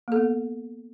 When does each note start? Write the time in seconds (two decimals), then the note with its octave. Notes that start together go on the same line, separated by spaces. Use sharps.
0.08 A#3
0.12 A4
0.16 B3